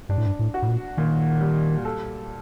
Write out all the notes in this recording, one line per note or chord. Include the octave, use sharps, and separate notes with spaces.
G2 D4
A2
G2
A2
F#4
A2
A#2
A#2 D#3
G3
A4